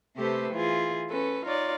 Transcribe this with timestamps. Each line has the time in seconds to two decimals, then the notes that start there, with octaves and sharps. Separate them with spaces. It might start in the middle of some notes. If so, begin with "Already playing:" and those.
0.15 C3 A3 G4 A4 B4 C5
0.53 E3 F4 G#4
1.10 C#4 A4 B4
1.45 D#4 F4 C#5 D5